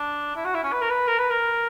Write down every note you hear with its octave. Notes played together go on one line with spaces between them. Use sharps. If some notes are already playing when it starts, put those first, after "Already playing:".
Already playing: D4
E4
F#4
E4
C#4
B4
A#4
B4
A#4
B4
A#4